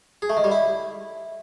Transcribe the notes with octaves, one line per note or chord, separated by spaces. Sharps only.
G#4
A3
D#3
G3
E4